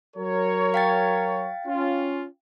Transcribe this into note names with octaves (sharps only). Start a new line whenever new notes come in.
F#3 A#4 C#5
F5 G5 A6
C#4 F4